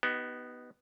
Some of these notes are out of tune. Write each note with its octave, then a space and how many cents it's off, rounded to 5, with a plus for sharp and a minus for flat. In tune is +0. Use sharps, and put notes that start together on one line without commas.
B3 +0 D#4 +0 G4 -45